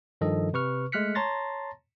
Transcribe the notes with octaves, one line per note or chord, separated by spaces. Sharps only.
G2 D#3 F3 A4 D#5
C3 B4 C#6 F6
G#3 A3 F6 F#6 B6 C#7
C#5 A5 A#5 C6 A6 A#6